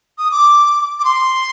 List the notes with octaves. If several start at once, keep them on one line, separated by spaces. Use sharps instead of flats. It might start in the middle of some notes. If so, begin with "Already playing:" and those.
D#6
D6
D6
C6